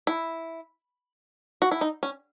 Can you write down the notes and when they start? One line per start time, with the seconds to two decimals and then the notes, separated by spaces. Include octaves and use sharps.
0.07 E4
1.62 F#4
1.71 E4
1.81 D#4
2.03 C#4